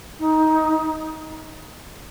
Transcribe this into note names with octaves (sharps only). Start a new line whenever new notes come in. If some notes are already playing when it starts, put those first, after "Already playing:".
D#4